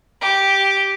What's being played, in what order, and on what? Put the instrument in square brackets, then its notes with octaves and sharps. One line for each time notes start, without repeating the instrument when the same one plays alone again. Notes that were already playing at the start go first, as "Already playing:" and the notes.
[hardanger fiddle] G4